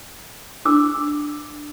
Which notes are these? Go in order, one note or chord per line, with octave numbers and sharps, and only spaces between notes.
D4 D6 E6